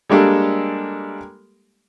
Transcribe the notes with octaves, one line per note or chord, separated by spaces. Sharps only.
G3 G#3 A#3 D4 G4 A4